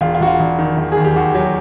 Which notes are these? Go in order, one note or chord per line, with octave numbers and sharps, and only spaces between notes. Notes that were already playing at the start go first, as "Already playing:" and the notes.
E1 F4
F4
E1 F#4
F4
E1
D#3
E1
D#2 G#4
G4
D#2 F#4
F#3 G4